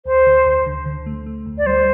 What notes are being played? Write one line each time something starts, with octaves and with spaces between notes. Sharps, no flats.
D2 C5
D3
D2
D3
D3
A3
A3
D2
D5
G3 C5